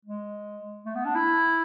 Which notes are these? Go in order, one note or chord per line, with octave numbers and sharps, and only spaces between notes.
G#3
A3
B3
D4
E4